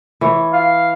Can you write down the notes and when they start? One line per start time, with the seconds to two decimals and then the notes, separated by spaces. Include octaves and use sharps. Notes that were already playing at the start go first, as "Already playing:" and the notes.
0.21 E3 C#5
0.53 F5